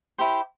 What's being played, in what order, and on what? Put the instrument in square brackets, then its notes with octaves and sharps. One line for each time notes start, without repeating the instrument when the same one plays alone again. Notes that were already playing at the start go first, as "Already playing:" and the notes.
[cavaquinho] E4 G4 C5